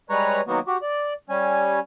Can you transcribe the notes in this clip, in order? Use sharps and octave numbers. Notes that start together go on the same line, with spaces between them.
G3 G#3 B4 C#5 A#5
D#3 F#3 A#3 B3 F#4
F#4 G4
D5
G3 C#4 G#5